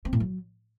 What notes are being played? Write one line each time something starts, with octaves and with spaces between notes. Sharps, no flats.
C4
A2
F#3